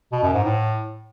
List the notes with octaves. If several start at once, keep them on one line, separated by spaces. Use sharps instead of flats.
B2
F#2
G#2
A2